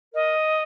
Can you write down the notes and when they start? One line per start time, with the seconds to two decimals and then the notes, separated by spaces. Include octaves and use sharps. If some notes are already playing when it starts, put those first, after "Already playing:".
0.12 A#4 D#5